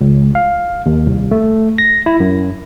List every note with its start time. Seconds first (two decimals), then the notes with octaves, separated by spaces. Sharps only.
0.01 C#2
0.35 F5
0.86 D#2
1.06 C2
1.31 A3
1.78 A#6
2.06 E4
2.20 F#2